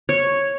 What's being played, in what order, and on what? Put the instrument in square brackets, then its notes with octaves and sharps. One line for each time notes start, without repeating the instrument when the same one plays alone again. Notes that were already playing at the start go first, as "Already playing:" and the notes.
[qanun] C#5